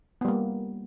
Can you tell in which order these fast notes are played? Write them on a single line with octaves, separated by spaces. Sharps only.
B3 G3 A#3